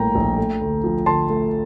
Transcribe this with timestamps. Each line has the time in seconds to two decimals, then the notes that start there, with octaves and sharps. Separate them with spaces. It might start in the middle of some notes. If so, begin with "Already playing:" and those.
Already playing: A#1 A2 G3 A#3 G5 A#5
0.15 A#1
0.37 A3
0.61 D2
0.84 F3
1.06 D3 A5 C6
1.30 A3